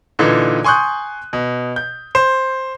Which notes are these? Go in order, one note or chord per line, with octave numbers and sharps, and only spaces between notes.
A#2 D3 E3 D#4
G#5 C6 C#6 D#6 F#6 G6
B2
G6
C5